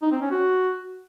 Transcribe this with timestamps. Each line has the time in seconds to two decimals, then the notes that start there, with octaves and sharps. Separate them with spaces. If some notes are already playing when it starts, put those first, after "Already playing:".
0.02 D#4
0.12 C4
0.21 C#4
0.31 F#4